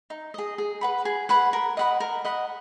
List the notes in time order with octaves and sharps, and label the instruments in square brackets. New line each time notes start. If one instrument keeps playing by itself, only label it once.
[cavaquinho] D#4
G#4 D#5
G#4
B4 F#5 B5
G#4
B4 F#5 B5
A#4
D#5 F#5 B5
A#4
D#5 F#5 B5